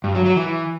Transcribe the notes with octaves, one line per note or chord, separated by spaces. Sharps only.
G2
F#3
F#3
E3